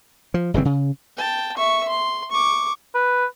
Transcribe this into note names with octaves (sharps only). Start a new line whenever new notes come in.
F3
G1 C#3 E3 C4
C#3
G5 A5
E5 C#6
C6
C#6 D6
B4